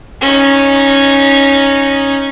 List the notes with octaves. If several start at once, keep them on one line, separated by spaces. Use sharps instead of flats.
C#4 D#4